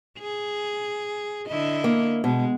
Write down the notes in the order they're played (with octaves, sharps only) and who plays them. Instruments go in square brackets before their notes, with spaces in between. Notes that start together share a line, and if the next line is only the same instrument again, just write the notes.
[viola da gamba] G#4
D3 E4 D#5
[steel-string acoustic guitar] A#3
[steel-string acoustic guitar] B2 [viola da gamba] G#3